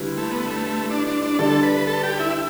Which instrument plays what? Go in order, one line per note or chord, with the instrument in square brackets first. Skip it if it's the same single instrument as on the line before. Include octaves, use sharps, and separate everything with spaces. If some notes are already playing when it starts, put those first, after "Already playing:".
Already playing: [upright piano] D3 G3 E4 B4
[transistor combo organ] A3
B3
A3
D4
D4
D4
[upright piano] D3 G3 D4 [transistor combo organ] A4
[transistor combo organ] B4
A4
G4
E4